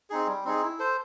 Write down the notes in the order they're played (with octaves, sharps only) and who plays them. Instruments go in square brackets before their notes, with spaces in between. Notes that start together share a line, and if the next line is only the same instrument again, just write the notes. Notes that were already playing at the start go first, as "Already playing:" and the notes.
[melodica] C4 D#4 G#4
G3
C4 D#4 G#4
E4
A4 C5